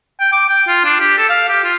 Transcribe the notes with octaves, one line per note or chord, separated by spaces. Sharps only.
G5
D6
G5
F4
D4
G4
A4
F5
G4
F4